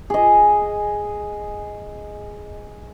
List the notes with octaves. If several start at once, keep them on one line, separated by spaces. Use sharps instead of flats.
G#4 D#5